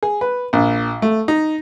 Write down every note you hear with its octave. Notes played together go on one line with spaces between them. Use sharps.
G#4
B4
A#1
A3
D#4